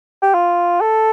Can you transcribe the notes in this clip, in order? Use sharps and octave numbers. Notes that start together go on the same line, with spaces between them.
G4
F4
A4